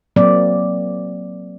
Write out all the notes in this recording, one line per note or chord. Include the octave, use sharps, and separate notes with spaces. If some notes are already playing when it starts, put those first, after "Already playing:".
F#3 A#3 C4 D5